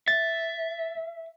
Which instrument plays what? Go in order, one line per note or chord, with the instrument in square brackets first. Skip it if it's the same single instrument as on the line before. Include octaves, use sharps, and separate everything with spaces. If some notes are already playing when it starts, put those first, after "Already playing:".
[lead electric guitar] E5 [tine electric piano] A6